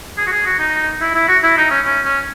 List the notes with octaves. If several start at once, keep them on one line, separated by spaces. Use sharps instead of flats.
G#4
F#4
G#4
F#4
D#4
E4
E4
F#4
E4
D#4
C#4
C#4
C#4